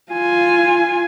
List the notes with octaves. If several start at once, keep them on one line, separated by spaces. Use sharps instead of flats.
F4 G#5